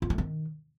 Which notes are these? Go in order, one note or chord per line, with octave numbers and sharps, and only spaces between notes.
F4
A3
D#3